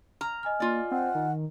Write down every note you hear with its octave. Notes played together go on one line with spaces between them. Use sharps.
A#5 F6
D#5 G#5 F6
A#3 F4 D5
C4 F#5
D#3